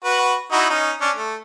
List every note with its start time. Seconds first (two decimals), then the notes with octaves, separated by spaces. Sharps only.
0.05 F#4 B4
0.52 D#4 E4 F#4
0.70 C#4 D#4
1.01 C#4 D4
1.16 A3